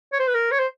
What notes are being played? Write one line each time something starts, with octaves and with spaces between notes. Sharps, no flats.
C#5
C5
B4
A#4
C#5
C5